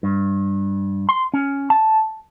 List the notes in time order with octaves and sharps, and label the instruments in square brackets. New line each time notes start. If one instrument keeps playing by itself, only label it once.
[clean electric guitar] G2
C6
C#4
A5